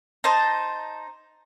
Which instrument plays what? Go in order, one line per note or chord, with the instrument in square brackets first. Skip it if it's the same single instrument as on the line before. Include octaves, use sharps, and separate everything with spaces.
[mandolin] D#4 C5 A5